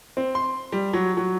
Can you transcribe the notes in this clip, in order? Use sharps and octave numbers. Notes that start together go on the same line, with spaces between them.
C4
C6
G3
F#3
F#3